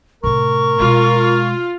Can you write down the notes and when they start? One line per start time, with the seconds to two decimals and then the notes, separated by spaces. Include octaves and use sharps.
0.23 A2 C3 A#4 C#6
0.80 B2 G#3 F4